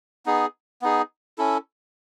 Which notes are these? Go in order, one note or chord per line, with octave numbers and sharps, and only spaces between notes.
B3 D#4 G#4
B3 D#4 G#4
C#4 E4 A4